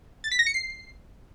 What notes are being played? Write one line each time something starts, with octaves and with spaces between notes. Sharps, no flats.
A6
B6
A#6
C#7
C7